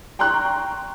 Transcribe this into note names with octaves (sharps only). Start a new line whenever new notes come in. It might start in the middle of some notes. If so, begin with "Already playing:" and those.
G5 A#5 C6 C#6 F#6